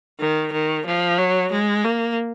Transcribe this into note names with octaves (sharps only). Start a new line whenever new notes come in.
D#3
D#3
F3
F#3
G#3
A#3